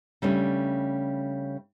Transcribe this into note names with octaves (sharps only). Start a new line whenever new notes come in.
C#3 G3 A3 C#4 D4